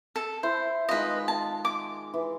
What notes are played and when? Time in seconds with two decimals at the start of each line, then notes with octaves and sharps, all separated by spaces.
0.16 A4
0.43 E4 C5
0.89 D#3 G#3 F4 B4 D#5
1.28 A5
1.65 D6
2.14 E3